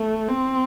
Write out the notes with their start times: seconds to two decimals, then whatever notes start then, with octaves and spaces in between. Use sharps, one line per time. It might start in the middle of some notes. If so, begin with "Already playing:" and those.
Already playing: A3
0.28 C4